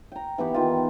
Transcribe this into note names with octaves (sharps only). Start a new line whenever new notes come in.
G5 A#5
E3 B3 G4 C#6
D#3 F4